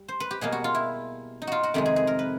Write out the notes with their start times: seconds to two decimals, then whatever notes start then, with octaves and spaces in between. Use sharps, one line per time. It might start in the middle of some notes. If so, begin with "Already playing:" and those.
Already playing: G3
0.08 C5
0.20 B4
0.31 G4
0.41 B2 G3 A#3 G#4
0.52 F#4
0.64 F4
0.75 E4
1.42 D#4
1.47 F4 F#4
1.63 F#4
1.74 F2 C3 D#3 G#3 G4
1.86 G#4
1.96 G#4
2.07 A#4
2.19 B4